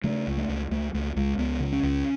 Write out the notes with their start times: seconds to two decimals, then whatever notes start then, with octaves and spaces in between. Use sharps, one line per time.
0.04 C#3 A3
0.27 C#2
0.37 A3
0.49 C#2
0.71 C#2 A3
0.94 C#2 A3
1.16 C#2 G#3
1.38 C#2 B3
1.60 C#3
1.72 C#4
1.83 C#2